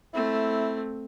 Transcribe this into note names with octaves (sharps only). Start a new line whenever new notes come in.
A3 C4 E4